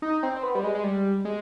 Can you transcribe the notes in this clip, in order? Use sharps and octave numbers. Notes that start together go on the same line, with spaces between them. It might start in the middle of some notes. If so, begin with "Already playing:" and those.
D#4
C4
C4
B3
G3
G#3
G#3
G3
G#3